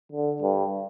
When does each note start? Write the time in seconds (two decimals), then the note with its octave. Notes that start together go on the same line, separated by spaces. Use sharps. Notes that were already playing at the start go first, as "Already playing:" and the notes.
0.12 D3
0.42 G2